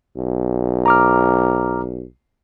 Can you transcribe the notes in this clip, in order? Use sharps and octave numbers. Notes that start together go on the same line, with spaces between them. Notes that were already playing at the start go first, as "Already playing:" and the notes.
B1
A#5 D6 F6